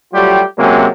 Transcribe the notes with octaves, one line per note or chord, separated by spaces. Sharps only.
F#3 G3 A3 F4 G4
C3 F#3 G#3 A#3 C#4